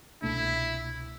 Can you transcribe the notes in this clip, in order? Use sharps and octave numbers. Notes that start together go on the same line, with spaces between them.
C2 B2 A3 D4 E4